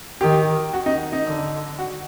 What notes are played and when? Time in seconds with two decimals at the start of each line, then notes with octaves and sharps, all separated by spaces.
0.21 D#3 G4
0.73 F#4
0.86 D#4
1.13 D#4
1.26 D3
1.79 F#4